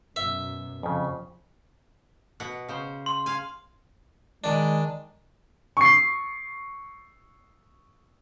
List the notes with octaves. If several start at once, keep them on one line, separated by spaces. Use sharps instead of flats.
F#2 B2 E5
F2 C#3 F3
B2 F#5
C#3 C5
C6
F5 G#5
D#3 G#3 D4
C#6 C7